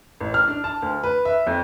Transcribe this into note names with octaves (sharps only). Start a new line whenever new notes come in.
A1
F6
D4
A5
D2
B4
E5
F2